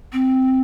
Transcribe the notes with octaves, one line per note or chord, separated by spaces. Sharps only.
C4